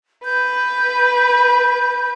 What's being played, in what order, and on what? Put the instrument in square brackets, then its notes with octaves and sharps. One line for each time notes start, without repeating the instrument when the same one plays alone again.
[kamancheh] B4 [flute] G6